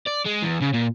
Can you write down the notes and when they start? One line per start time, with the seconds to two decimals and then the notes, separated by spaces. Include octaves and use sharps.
0.07 D5
0.26 G#3
0.43 E2
0.62 C#3
0.74 A#2